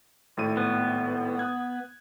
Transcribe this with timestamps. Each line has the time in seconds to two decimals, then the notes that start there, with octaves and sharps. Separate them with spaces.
0.37 G#1 A2 D#7
0.57 B3
1.39 D#6 F#6 G#6